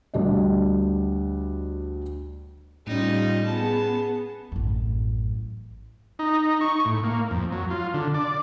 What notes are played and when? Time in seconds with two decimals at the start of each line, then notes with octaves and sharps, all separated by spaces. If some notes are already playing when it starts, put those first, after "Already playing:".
0.14 D2 G3 D4 D5 D#5
2.87 A2 G3 C#4 D#4 F4
3.46 B3 G#4 A5
4.52 A1 F#2
6.19 D#4
6.61 C#6
6.85 A2
7.03 A#3
7.31 F2
7.53 F#3
7.71 F4
7.94 D3
8.14 D5